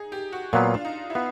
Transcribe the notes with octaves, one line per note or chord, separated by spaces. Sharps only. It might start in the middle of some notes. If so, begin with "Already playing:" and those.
Already playing: D#4 G#4
G4
F#4
A#2 F#3 B3 F4
D4
D#4
E4
B3 F4